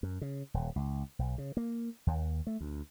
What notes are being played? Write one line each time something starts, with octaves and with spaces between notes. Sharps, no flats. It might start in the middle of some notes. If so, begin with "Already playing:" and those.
F#2
C#3
D#1
C#2
B1
C#3
A#3
D#2
A3
D2